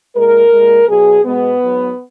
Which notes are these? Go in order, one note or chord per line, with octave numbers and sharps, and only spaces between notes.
A#2 G#3 A#4
A#2 G#3
B2 F#3 G#4
B2 G#3 B3
G#2 F#3